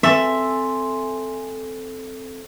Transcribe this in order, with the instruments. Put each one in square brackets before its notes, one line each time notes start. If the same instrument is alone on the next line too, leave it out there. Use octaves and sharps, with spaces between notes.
[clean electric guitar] C4 A4 G#5 [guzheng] E5